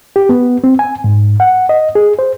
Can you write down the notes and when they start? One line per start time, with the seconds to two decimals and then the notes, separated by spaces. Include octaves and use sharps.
0.16 G4
0.29 B3
0.64 C4
0.79 G#5
1.04 G#2
1.40 F#5
1.69 D#5
1.95 G#4
2.19 C5